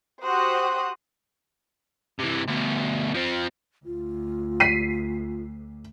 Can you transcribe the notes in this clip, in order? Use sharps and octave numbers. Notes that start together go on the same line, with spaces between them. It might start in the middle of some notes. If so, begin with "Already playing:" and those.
F#4 G4 C5 D#6 F#6
C3 E3
D2 B2
F3 C4
D2 F4
B6 C7 D#7